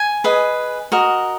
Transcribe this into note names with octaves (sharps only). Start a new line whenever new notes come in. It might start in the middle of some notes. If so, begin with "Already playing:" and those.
Already playing: G#5
G#4 B4 D#5
F#4 A#4 D#5